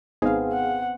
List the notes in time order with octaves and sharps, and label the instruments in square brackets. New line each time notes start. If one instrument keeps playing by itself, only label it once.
[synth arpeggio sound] G#1 D#4 C5 [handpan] B3 C4 [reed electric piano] G#4 F5
[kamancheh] F#5